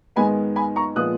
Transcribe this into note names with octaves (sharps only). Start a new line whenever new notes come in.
G#2 D#3 G#3 B3 G#5 B5
G#5 B5
A#5 C#6
A#2 F3 G#3 B3 D#6 F#6